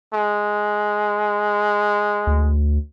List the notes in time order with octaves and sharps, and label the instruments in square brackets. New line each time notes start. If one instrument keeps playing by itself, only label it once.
[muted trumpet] G#3
[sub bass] D2